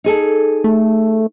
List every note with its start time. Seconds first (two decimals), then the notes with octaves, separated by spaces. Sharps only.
0.04 D#4 G#4 A4
0.64 A3